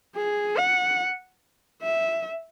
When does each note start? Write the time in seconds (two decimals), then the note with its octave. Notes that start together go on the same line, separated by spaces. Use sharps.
0.17 G#4
0.58 F#5
1.83 E5